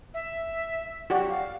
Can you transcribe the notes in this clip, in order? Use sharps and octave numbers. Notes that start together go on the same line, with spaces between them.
E5
F#4 G4 D5
F5